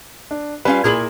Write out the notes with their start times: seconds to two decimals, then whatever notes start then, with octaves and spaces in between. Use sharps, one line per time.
0.31 D4
0.65 G3 C#4 F4 B4 F5
0.84 A#2 E4 G#4 A#4 F#7